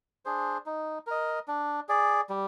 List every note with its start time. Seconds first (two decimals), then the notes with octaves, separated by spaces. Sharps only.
0.25 D4 G#4 C5
0.66 D#4
1.07 A#4 D#5
1.48 D4
1.89 G#4 D5
2.29 G3